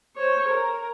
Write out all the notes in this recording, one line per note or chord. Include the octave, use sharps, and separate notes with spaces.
C5 C#5
A#4